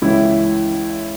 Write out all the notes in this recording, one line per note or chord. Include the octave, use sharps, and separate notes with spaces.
C#2 C#3 E3 E4